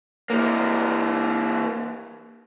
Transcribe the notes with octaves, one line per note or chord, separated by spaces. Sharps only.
E3 A#3